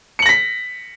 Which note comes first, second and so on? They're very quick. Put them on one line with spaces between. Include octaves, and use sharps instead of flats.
C#7 F#7 A#6 B6